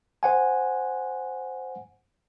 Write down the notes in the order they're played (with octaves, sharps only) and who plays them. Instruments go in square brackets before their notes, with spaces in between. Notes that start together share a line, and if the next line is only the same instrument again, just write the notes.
[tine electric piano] C5 F#5 G#5